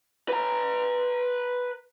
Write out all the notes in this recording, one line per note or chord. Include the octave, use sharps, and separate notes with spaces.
B4 A#5